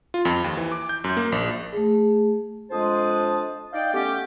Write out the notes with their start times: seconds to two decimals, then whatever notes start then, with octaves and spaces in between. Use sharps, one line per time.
0.14 F4
0.25 F2
0.44 D#2
0.57 E3
0.72 D6
0.89 G6
1.04 F#2
1.17 A#3
1.32 A#1
1.73 A3 G#4
2.71 F2 G#3 D4 C5 A5 D#6
3.73 D#4 D5 D#5 F5 G5
3.93 A3 B3 C#4 G4